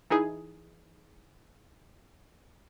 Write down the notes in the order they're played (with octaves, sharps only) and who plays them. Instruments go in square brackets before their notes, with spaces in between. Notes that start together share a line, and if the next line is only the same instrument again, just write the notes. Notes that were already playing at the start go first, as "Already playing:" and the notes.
[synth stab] E3 D#4 E4 G#4